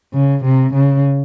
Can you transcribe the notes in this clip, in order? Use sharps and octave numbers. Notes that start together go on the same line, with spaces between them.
C#3
C3
C#3